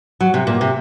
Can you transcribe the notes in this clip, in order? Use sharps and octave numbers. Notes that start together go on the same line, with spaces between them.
F#3
C3
A#2
C3